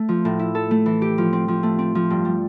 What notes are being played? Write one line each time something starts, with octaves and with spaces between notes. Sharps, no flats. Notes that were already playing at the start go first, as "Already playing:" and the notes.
Already playing: A3
F3
A2
E4
A4
A3
E3
G4
F3
C4
F3
A3
C4
F3
G2
G3